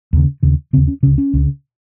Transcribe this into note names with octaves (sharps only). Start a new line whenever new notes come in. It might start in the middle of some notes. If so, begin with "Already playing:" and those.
D#2 C#3
D#2 C#3
D#2 C#3 C4
C#4
C#2 C#3 C#4
C#4
C#2 C#3